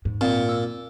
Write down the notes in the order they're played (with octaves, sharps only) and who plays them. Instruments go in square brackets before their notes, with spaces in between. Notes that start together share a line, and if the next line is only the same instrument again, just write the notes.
[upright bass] G#2
[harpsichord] A#2 [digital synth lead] C4
[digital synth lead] E6